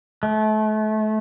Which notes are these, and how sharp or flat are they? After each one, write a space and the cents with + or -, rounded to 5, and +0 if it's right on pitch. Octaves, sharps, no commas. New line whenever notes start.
A3 -30